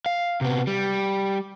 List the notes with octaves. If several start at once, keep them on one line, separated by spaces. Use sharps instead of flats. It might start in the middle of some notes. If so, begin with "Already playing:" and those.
F5
C3 B3
G3